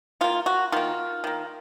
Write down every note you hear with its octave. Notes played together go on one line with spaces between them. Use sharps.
D#3 A#3 F4
F#4
D#3 A#3 F4
D#3 A#3